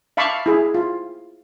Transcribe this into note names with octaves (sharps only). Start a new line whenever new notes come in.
E5 F5 A5 B5 C#6 D6
E4 G#4
F4